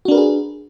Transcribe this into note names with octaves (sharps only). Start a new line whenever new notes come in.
D4 F#4 G#4 A#4 B4